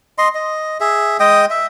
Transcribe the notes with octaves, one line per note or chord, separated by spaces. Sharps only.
D#5 C6
D#5
G#4 E5
G#3 D#5 G5 D#6
E5